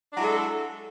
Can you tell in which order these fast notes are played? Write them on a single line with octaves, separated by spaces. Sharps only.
D4 F#3 E4 G#3 A4